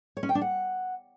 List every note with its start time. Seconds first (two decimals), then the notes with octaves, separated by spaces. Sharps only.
0.17 C#5
0.23 C#4
0.29 G5
0.35 D4
0.41 F#5